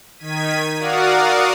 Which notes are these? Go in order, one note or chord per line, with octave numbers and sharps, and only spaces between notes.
D#3 G#6 B6 D#7
F#4 A#4 D5 F5 F#5 D#6